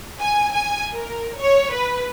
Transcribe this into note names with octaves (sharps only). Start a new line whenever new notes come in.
G#5
G#5
A#4
C#5
B4